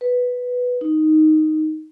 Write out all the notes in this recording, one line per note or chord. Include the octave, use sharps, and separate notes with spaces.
B4
D#4